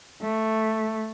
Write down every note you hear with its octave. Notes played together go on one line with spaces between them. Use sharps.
A3